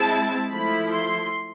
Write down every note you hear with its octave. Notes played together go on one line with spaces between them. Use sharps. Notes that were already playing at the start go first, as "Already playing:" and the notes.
Already playing: G#3 C4 E4 A5
F3 A3 E4 B5
C6